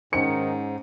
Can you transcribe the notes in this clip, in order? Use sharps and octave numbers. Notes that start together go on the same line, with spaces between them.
G#2 D#3 C#4 C5 C#7